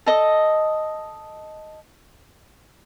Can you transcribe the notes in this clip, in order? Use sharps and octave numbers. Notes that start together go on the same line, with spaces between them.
A4 D#5